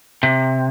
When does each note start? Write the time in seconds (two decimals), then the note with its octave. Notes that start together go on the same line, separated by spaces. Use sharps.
0.23 C3